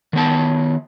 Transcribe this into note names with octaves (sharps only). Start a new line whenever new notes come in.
D#3 B3 A5